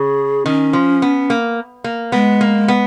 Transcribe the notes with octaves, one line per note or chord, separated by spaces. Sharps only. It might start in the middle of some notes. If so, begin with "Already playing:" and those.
Already playing: C#3 G#4
D#3 C#4
F3
B3
A#3
A#3
G#3 B3
A#3
B3